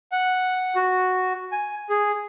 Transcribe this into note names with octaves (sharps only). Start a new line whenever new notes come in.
F#5
F#4
G#5
G#4